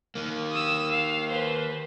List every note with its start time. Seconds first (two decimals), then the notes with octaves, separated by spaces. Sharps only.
0.15 D#3 A#3
0.51 D#6 E6
0.91 F5
1.29 B4 C5